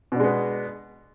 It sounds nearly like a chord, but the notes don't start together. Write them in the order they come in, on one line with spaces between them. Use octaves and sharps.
B2 D4 G#3 B3